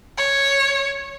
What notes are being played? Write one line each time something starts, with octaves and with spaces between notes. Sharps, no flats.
C#5